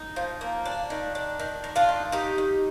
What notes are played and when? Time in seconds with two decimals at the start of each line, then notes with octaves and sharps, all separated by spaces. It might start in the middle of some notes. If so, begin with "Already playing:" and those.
Already playing: D#4
0.16 F3
0.41 A#3
0.65 D4
0.90 D#3
1.15 D4
1.40 D#3
1.64 D#3
1.76 D4 F4
1.89 D#3
2.12 D#3 D#4 G4
2.38 D#3